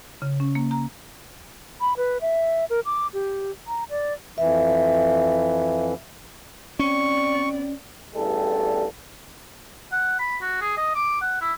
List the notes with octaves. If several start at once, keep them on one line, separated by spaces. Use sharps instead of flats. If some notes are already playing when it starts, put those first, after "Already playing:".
C#3
C#4
A#3
A#5
B5
B4
E5
A#4
D6
G4
A#5
D5
F2 E3 E5
C4 C#4 D5 C#6
A1 E2 G2 G3 G#4 A4
F#5
B5
F#4
G#4
D#5
D6
F#5
E4